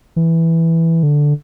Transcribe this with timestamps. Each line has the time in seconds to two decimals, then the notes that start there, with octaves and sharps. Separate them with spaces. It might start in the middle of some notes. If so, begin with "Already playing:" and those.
0.16 E3
1.03 D3